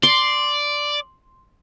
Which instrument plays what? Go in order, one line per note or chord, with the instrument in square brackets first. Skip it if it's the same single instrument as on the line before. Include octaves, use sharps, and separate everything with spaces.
[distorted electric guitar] D5 [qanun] C6